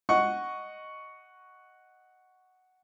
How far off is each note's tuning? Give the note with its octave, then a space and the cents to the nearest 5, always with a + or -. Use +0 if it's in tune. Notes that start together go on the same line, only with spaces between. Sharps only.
D#5 +0 F#5 +0 C#6 +5